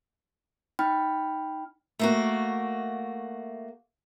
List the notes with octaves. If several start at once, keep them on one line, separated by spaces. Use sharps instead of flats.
D#4 G5 B5 F6
A3 A#3 F#4